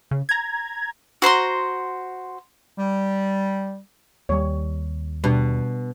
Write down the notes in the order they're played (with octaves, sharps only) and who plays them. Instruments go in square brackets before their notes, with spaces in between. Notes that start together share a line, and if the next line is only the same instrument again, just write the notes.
[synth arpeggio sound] C#3
A#5 G#6
[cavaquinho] F#4 C5 A#5 C6
[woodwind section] G3
[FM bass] D#2 [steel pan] G3 C#5
[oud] B2 [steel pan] G3 D4